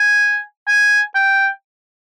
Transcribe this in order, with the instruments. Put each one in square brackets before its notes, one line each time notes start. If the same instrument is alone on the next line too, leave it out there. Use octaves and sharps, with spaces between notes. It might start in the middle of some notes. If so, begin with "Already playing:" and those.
Already playing: [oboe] G#5
G#5
G5